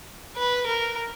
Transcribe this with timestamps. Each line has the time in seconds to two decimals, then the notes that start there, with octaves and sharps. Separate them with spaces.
0.37 B4
0.66 A#4